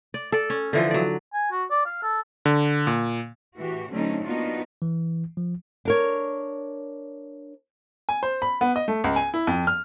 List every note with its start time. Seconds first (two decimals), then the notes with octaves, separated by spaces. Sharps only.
0.14 D5
0.32 A4 D5
0.50 C#4
0.73 D3 E3 F3
0.91 F#3 D5
1.33 G#5
1.51 F#4
1.70 D5
1.86 F5
2.02 A4
2.46 D3
2.87 A#2
3.57 A2 E3 F#4 G4
3.90 D3 F#3 A3 C4 C#4 D#4
4.24 A#3 B3 D4 D#4 F4 F#4
4.82 E3
5.37 F3
5.85 D4 A#4 C#5
8.09 G#5
8.23 C5
8.42 B5
8.61 B3
8.76 D#5
8.88 A3
9.04 C#2
9.16 G#5
9.34 E4
9.47 F2
9.67 F6